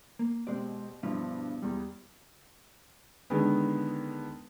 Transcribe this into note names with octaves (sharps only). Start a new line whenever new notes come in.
A#3
B2 G#3 C4 G4 D5
G2 B2 F3 E4 F4
E2 G3
D3 D#3 G#3 B3